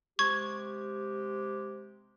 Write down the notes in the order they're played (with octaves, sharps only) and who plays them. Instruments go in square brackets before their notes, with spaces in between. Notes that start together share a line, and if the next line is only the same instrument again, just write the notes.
[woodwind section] C3 G#3 G4 [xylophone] C#6 G#6